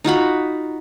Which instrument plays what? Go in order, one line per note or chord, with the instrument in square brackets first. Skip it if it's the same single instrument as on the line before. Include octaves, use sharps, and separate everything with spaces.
[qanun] D#4 F4 F#4 B5